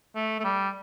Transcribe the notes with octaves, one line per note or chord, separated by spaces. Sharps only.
A3
A3
G3